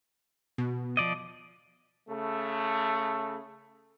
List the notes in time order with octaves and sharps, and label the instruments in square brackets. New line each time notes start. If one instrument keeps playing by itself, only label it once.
[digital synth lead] B2
[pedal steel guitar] F3 D5 D#5
[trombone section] C#3 A3